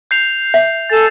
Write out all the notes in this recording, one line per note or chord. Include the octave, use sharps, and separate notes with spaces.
G6 C7 F7
E5
A4 G#5 A6 E7